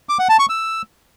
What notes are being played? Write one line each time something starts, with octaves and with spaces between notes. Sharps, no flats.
D6
F#5
A5
C#6
E6